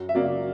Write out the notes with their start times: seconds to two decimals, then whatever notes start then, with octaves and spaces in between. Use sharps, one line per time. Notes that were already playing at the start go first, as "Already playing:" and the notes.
Already playing: F#2
0.09 E5
0.15 C#3 F#3 A#3 D5